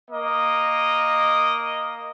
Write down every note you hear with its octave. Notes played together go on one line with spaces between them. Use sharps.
A#3 D#5